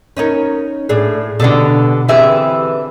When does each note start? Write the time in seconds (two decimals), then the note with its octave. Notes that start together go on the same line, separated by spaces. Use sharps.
0.17 C#4 D#4 A#4
0.89 A2 D4 G#4
1.40 B2 D3 G3 D4 A4
2.08 D3 E3 C4 G4 G#4 E5